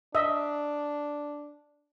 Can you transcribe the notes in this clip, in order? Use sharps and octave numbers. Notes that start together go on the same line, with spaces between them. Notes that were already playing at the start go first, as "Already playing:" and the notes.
D4 D#5 E5